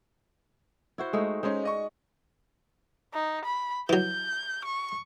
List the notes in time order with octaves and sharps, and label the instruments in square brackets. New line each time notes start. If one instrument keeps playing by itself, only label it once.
[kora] E4 F#4 C5
G#3 A3 D#4
[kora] G#3 [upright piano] C#4 D#4 C5
[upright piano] D5 D#5 C#6
[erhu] D#4
B5
[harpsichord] E3 F#3 [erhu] G6
[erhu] C#6